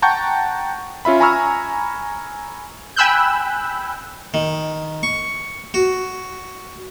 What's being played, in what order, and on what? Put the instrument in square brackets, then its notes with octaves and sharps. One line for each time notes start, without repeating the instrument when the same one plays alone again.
[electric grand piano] F#5 G5 A5 A#5 C#6 G6
C#4 F4 E5 B5
G#5 A#5 B5 C#6 E6 F6
[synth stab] G5 G#5 B5 E6 F#6 G6
[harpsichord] D#3
C#6
F#4